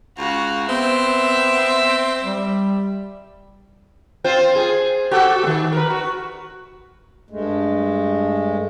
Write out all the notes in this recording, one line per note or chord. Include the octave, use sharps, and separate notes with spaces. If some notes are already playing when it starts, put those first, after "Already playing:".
C#2 F#4 F5
B3 C4 E5
G3
C4 F4 C5
G#4
F#4 G4 A4
D#3 A#3
A#4 B4
F#4
G2 G#3 A3